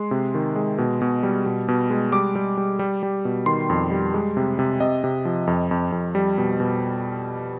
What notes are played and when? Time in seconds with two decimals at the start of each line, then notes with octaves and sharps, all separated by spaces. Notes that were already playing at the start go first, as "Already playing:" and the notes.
Already playing: G#3 C6
0.11 C3
0.34 D#3
0.56 G#3
0.78 B2
1.02 B2
1.23 G3
1.46 B2
1.68 B2
1.90 G#3
2.12 G3 D6
2.35 G3
2.58 G3
2.79 G3
3.03 G3
3.25 B2
3.46 D#3 C6
3.70 F2
3.91 G3
4.14 G#3
4.37 C3
4.59 C3
4.80 C3 D#5
5.04 C3
5.25 F3
5.47 F2
5.71 F2
5.92 F2
6.15 G3
6.38 B2
6.60 B2